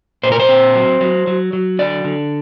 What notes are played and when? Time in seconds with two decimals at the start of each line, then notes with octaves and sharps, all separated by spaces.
0.23 A#2 C5
0.32 A#4
0.40 C5
0.49 C4
0.75 F#3
1.01 F#3
1.27 F#3
1.53 F#3
1.79 D3 D5
2.05 D3